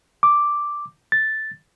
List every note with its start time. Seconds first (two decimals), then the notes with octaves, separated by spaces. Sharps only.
0.23 D6
1.12 A6